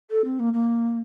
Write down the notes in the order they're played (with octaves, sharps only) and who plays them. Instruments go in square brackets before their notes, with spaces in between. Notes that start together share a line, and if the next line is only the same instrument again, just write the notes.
[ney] A4
C4
A#3
A#3